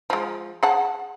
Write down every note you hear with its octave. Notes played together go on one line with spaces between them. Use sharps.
F3 G#3
G#4 F#5 A5